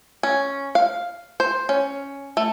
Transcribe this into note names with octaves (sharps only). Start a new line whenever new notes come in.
C#4
F5
C5
C#4
A3